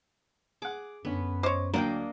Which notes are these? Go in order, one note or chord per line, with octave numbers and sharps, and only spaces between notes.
G#4 F#5 D6
F#2 D3 B3 C#4
C5 C#5 D#5 D6
D2 F#3 A#3 D4 A#4 D#5 F#5 G5